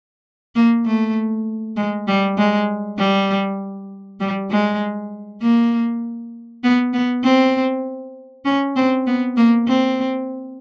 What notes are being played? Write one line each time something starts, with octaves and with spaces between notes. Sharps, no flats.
A#3
A3
G#3
G3
G#3
G3
G3
G#3
A#3
B3
B3
C4
C#4
C4
B3
A#3
C4